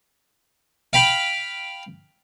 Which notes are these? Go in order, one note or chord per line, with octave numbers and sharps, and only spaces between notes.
F5 G5 B5